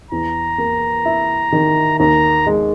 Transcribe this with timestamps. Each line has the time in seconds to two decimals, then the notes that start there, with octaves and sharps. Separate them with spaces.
0.11 E2 A#5
0.58 A#3
1.05 E4
1.52 D#3
1.99 D#2 A#5
2.47 G#3